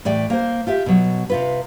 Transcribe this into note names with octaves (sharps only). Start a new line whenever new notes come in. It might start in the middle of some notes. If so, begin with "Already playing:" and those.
A2 E3 D5 G5
A#3 C5
F4 G4 E5
B2 F#3
C3 F4 B4